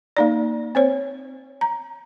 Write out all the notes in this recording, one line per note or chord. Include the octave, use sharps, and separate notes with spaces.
A#3 D#4 D5
C4 C5 C#5
A#5